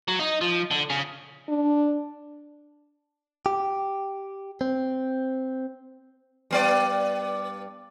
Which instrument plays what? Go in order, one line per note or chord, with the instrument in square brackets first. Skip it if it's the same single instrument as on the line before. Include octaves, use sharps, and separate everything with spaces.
[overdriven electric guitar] F#3
D#4
F3
D3
C#3
[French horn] D4
[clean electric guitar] G4
C4
[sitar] G2 B3 D5